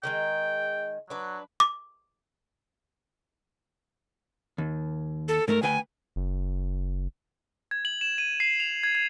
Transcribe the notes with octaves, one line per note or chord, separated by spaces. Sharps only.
D3 D#3 G#3 G5
F#3 D4 B4
D6
D#2
A4
G#2 A3 A#4
D2 B4 G5 G#5
F#1
G#6
F#7
E7
D#7
C7
F7
G#6
G#6